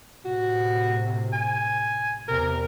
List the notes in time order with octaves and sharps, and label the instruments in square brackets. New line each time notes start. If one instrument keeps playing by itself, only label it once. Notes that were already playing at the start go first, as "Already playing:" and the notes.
[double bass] A2 C3 [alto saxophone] F#4
[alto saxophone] G#5
[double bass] E2 C3 [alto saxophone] A#4